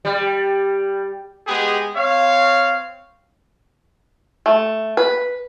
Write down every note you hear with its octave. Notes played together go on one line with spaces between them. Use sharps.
G3
G#3 B3 G4 G#4
C4 C#5 F5
A3
B4